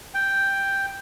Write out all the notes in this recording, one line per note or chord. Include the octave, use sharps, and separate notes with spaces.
G5